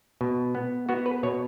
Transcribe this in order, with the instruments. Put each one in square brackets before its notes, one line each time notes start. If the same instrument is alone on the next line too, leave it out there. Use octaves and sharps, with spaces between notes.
[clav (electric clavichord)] B2
B3
B3 F#4
B4
B2 C#5